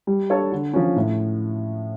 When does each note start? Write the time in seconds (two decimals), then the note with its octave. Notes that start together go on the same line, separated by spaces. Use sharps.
0.07 G3
0.30 D4 A4 C#5
0.52 D3
0.73 F3 C#4
0.96 A2